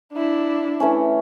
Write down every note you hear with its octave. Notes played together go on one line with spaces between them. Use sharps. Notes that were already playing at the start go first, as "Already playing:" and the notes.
D4 E4
E3 A3 C#4